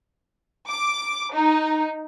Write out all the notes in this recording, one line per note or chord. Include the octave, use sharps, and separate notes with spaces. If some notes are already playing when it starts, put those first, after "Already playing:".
D6
D#4